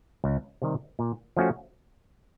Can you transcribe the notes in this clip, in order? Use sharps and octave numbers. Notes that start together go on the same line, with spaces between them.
C#2
C3 D#3 G3
A#2
F3 A3 C#4 F#4